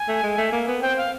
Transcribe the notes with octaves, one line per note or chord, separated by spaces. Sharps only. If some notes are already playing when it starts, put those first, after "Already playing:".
Already playing: G#5
A3
G#3
A3
A#3
B3
C4 G5
F5